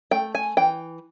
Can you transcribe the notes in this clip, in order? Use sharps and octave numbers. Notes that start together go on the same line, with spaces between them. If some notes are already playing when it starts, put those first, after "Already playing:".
A3 G5
G#5
E3 G5